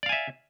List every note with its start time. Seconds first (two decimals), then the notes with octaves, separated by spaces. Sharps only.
0.03 D5
0.06 F5
0.09 G#5
0.12 E5